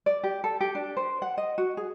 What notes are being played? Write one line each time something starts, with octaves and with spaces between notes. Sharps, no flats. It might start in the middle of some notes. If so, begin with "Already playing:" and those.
D5
G4
A4
G4
D4
C5
F#5
D#5
F#4
G#4